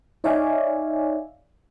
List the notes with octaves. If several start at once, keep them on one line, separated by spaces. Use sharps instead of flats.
D#4 C#5 D5 E5 F5 G#5